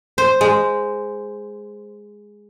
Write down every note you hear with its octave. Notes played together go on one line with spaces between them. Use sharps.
C5
G#3